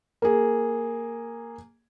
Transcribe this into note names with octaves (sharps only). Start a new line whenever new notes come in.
A#3 G#4